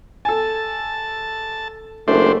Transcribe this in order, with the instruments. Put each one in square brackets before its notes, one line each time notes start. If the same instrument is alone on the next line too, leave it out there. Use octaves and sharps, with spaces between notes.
[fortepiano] A4 G#5 [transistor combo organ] A5
[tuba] F#1 [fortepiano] A3 [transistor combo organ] D4 C5